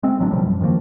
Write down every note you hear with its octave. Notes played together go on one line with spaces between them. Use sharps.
G#3 A3 C4
A1 F#3 B3 D4
B2 D3 F3 G3
F#2
G2 D#3 F3 A#3